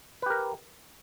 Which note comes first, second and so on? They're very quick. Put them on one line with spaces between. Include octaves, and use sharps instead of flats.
B4 G4 A#4